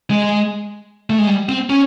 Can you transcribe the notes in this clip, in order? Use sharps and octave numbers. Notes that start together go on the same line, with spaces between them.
G#3
A3
G#3
G3
C4
C#4